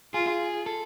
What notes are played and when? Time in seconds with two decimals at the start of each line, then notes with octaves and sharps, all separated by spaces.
0.14 F4 G#4
0.66 A4